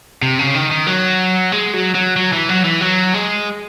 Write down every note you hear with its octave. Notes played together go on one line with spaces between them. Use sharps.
C3
C#3
D#3
D#3
F#3
G#3
F#3
F#3
F#3
E3
F#3
E3
F#3
G#3